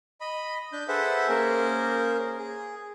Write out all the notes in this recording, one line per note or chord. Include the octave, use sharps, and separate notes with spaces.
D#5 B5
D4 G6
G#4 A4 B4 C5 E5 F#5
A#3 C#4 G#4 A#4 C5
G#4